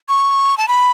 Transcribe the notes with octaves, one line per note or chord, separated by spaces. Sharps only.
C#6
A5
B5